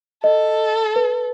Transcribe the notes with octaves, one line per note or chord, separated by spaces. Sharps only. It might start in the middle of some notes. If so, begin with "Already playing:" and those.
A4 D#5
B4